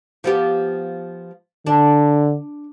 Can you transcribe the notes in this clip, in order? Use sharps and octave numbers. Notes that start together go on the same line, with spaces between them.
F3 B3 G4
D3 D4